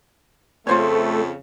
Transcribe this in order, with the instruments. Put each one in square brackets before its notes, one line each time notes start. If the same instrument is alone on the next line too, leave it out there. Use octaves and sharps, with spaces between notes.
[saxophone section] F2 C#3 [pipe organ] A3 [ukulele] F4 C5 C#5